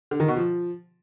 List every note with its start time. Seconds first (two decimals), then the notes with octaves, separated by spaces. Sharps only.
0.11 D3
0.20 D#3
0.28 B2
0.37 F3